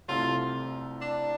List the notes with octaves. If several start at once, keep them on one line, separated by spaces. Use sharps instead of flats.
C2 C3 A3 F4
D4